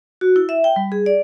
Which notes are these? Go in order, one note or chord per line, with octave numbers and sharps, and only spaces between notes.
F#4
E4
E5
G5
G3
G#4
D5